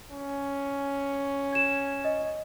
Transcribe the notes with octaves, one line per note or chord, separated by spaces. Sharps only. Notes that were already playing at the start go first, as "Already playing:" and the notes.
C#4
G#6 E7
D#5